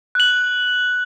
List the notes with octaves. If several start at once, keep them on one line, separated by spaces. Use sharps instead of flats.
F#6 F#7